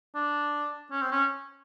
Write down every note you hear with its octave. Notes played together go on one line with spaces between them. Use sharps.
D4
C#4
C4
C#4